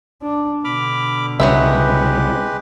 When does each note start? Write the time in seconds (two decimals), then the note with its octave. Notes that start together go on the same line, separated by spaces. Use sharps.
0.22 D4
0.65 B2 D3 B5 D6 F6
1.40 C2 C#3 F#3 G#3 B3 G4 B4 E5